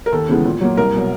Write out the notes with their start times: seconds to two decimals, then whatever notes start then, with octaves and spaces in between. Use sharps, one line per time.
0.06 A#4
0.12 D#2 A4
0.28 C#3 E3 G#3 B3
0.45 A#2
0.61 F#3 A#3
0.77 C2 A#4
0.94 B2 F#3